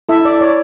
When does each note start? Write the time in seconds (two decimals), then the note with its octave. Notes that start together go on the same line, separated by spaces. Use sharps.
0.09 E4 A4 E5
0.25 D5
0.41 C#5 D5